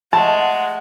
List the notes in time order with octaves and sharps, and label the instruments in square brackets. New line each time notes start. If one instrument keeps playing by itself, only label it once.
[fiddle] G#3 [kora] A3 [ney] F#5 [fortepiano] A5